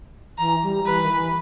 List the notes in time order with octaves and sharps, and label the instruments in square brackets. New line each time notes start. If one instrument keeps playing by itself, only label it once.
[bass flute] E3 [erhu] A#5
[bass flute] G3
[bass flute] E3 [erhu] B4
[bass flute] D#3
E3